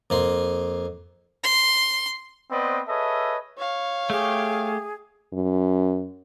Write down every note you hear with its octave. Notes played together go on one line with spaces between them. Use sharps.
F2 A#3 C6
C6
B3 C4 B4 C5 D5 D#5
G#4 A4 B4 C#5 D#5 E5
C#5 F5
A3 G4 G#4
F#2